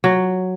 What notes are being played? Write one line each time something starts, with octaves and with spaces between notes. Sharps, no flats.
F#3